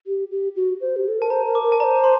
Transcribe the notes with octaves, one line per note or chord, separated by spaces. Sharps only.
G4
G4
F#4
C5
G4
A4
A#4 A5
C5 A#5
A#4
D6
A#4
A5
C5 D5 A#5
C6